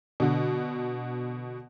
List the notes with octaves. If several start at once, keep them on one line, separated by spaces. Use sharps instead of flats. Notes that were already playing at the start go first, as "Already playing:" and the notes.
B2 D3